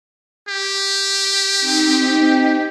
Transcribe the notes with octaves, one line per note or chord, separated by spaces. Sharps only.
G4
C4 D#4 G5